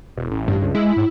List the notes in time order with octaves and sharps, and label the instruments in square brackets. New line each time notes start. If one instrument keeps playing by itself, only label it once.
[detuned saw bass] E1
A1
[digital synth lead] G2
[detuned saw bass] C#2
[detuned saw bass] G#3 [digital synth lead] E4
[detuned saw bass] G#2